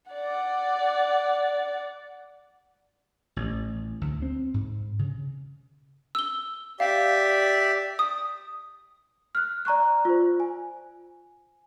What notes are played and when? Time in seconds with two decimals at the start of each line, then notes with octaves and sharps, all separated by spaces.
0.11 D5 F#5
3.36 A1
4.01 D2
4.22 C4
4.54 G#2
4.99 C#3
6.15 E6 G7
6.80 G4 D5 E5 F5
7.99 D#6
9.35 F6 F#6
9.65 D5 A#5 C#6 F#6
10.05 F4 C5
10.40 G#5